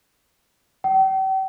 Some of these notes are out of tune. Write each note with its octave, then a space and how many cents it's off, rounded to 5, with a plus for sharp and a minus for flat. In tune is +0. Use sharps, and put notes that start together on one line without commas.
G5 -40